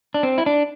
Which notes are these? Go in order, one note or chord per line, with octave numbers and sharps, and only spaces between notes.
D4
C4
E4
D4